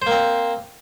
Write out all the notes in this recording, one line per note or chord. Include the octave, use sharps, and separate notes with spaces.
A#3 C4 C5